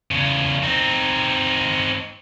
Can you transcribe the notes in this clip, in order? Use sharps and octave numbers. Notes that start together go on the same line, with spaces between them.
E2 C#3
C4 D#4